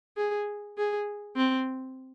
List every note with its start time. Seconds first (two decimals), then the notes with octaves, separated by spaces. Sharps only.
0.17 G#4
0.77 G#4
1.36 C4